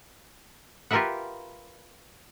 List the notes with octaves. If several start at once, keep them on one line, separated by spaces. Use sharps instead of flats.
F4 G4 A#4 B4 E5 F#5